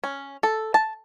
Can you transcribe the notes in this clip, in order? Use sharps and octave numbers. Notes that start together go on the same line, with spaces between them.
C#4
A4
A5